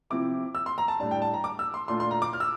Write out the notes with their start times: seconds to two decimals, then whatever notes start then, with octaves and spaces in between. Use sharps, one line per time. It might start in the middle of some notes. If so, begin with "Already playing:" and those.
0.10 C3 F3 C4 E4 D6
0.55 E6
0.66 C6
0.78 A#5
0.88 A5
1.00 A2 G3 D4 A5
1.11 G5
1.22 A5
1.34 A#5
1.44 D6
1.59 E6
1.74 C6
1.88 A#2 A3 D4 F4 C6
2.00 C6
2.11 A#5
2.22 D6
2.33 F6
2.40 E6